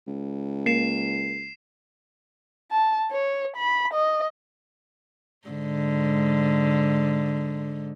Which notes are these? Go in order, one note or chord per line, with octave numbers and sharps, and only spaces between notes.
C#2
A#3 C7 E7
A5
C#5
B5
D#5
G#2 D3